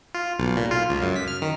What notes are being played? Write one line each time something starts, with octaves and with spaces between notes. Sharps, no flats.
F4
B1
A#2
F4
C#2
F#2
B6
F6
D#3